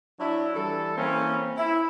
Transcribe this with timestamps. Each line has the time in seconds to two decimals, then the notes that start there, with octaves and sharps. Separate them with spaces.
0.19 F#3 D4 E4
0.55 E3 G3 A4
0.97 E3 A#3 C4 C#4
1.57 E4